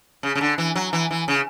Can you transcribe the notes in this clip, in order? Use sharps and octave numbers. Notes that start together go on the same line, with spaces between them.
C#3
C#3
D3
E3
F#3
E3
E3
C#3